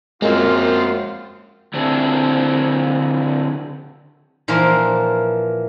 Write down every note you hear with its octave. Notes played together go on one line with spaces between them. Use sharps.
F#2 G#3 A#3 C4 F4
D3 C4 D4 E4 G#4
A#2 E3 F3 A#3 A#4 C6